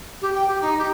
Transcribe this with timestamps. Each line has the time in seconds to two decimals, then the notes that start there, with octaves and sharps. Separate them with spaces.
0.22 G4
0.35 G5
0.48 G4
0.62 D#4
0.79 G4